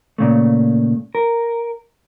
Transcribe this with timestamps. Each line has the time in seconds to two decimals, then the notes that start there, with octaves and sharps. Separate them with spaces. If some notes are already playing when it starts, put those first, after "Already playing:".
0.18 A#2 C#3 A3
1.15 A#4